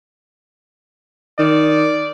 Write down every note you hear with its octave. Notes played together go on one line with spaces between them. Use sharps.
D#3 D5